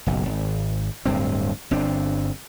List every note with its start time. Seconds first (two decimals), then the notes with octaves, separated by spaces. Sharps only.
0.06 F#1 B1
0.26 G#1
1.06 D1 G2 C4
1.71 G1 C4 D4